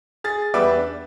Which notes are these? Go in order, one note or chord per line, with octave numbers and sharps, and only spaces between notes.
G#4 A6
E2 G3 B4 D5 E5 D6
D4